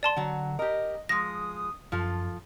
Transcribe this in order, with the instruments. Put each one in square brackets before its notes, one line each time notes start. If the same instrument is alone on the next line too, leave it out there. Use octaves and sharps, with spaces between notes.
[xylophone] D5 A5 C6
[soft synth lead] D3 [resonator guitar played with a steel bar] F#3 F#5
[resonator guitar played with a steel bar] G4 A#4 [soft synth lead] D#5
[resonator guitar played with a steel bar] F3 G#3 [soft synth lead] D#6 [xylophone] A#6
[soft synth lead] F#2 [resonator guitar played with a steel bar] F3 F4 A4